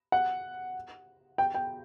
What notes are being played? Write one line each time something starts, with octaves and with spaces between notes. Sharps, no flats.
F#5
G5
G5